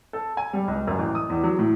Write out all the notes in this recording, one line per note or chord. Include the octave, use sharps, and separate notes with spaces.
A4
G#5
G3
C#2
F#2
A1
D#6
E2
F#3
A2